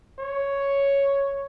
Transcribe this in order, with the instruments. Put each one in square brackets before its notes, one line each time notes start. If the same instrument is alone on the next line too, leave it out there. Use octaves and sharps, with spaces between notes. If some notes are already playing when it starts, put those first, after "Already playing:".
[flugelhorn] C#5